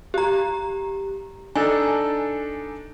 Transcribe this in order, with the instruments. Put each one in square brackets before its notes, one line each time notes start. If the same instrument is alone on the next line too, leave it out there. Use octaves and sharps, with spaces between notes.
[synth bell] G4 A#5
[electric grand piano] D4 D#4 A4 [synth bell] G#5